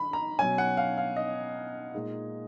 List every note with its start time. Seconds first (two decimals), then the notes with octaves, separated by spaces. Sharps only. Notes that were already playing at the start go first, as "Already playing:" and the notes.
Already playing: D#3 B5
0.13 A#5
0.39 B2 F#3 C#4 G#5
0.58 F#5
0.77 F5
0.98 F5
1.16 D#5
1.93 A#2 G#3 D#4